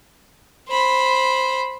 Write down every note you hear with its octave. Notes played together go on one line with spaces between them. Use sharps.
C5 B5